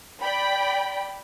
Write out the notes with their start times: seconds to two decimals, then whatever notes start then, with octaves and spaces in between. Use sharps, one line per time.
0.22 D5 G5 B5